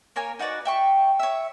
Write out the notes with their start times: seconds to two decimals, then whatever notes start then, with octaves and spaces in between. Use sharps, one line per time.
0.16 A#3 A#4 C#5 G#5
0.39 D#4 F#4 B4 D5
0.65 E5 G5 C#6
1.19 C#5 E5